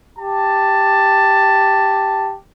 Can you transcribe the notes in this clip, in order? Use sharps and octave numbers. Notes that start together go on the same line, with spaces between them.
G4 A5